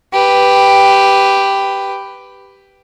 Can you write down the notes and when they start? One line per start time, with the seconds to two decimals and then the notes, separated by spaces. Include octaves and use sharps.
0.13 G4 B4